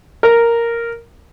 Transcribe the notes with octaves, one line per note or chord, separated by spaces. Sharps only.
A#4